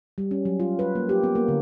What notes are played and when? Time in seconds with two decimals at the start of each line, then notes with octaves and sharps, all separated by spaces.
0.18 G3
0.31 C#4
0.45 F#3
0.60 F4
0.79 B4
0.95 A#3
1.09 G4
1.23 B3
1.35 A#3
1.48 D3